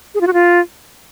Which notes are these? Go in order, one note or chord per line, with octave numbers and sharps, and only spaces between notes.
G#4
F4
F#4
F4